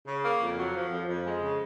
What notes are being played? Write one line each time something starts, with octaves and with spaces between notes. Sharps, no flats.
C#3
A#3
F2
F#3
F3
F2
F2
G#3
C#3